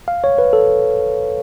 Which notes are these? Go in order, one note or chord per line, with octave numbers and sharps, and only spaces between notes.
F5
C#5
B4
A4